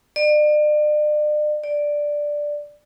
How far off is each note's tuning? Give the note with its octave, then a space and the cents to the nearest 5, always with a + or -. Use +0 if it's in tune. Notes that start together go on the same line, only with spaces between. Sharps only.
D5 +40
D5 +5